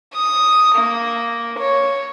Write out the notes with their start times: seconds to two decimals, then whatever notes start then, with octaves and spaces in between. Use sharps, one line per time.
0.14 D#6
0.75 A#3
1.58 C#5